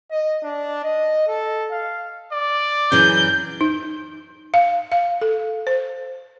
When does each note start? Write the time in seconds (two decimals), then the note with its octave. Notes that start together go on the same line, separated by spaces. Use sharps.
0.11 D#5
0.43 D4
0.84 D#5
1.28 A4
1.72 F5
2.32 D5
2.92 F#2 E3 G#4 G6
3.61 D#4
4.54 F5
4.92 F5
5.22 A4
5.67 C5